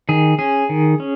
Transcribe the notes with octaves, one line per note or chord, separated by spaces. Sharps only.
D#3 G#4
C#4 G#4
D#3
C#4